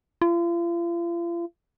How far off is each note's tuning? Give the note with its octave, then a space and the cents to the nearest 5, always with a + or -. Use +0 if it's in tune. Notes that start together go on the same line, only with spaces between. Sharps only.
F4 -40